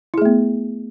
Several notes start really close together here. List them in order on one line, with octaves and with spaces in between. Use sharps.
E4 G#4 A3 B3